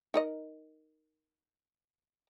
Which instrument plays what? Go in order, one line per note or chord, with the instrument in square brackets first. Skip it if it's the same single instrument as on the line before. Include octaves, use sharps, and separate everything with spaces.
[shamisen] D#4 A#4 D#5